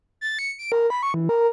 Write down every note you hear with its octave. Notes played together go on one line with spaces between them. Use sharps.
A6
C#7
D7
A#4
B5
C#6
E3
A#4